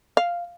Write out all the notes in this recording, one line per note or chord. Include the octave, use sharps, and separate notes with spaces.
F5